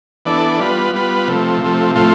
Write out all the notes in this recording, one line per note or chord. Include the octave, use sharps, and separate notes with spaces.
E3 B3 D4 A4 D5
G3 B3 F4 B4
G3 B3 F4 B4
C3 F3 A3
C3 F3 A3
A2 F3 A3 C4 F4